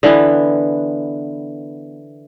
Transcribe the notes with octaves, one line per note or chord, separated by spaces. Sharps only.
D3 E3 B3